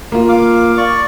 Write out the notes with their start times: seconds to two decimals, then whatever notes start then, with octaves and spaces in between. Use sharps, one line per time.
0.12 A#3 F4
0.29 F5 D6
0.77 D5 C#6